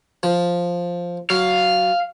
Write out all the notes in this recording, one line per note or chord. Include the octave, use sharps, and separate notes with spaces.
F3
F#3 F5